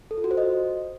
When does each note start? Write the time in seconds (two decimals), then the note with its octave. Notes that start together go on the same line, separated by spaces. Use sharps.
0.11 A4
0.17 F4
0.24 F#4
0.31 C5
0.37 D#5